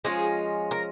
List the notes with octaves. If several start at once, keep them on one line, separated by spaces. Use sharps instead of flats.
F3 G#3 C#4 F4 G#4
A#4